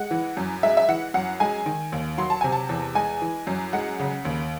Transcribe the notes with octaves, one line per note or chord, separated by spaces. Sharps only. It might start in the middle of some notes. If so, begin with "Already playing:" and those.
Already playing: G#3 F#5
E3
F#2
G#3 E5
E5
E3 F#5
F#2 F#5
G#3 G#5
D#3
D#2
F#3 C6
A5
C3 G#5
A5
E2
G#3 G#5
E3
F#2
G#3 F#5
C#3
D#2